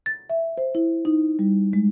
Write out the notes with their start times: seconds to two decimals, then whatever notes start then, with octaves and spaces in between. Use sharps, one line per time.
0.06 A6
0.30 E5
0.58 C5
0.75 E4
1.05 D#4
1.39 G3
1.73 G#3